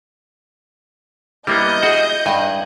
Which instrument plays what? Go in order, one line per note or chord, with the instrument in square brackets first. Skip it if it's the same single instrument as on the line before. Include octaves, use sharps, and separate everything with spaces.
[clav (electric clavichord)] G3 A#3 B3 [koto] E4 [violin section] D#5 G6
[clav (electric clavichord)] F#4 [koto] G#4 F#5
[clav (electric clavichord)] G2 [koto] F#5 G#5